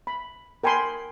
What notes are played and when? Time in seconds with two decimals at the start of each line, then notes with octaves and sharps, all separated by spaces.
0.07 B5
0.63 A#4 G5 G#5 B5 C6